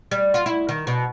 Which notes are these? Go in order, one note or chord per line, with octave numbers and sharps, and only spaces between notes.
G3
F4
E4
D#3
B2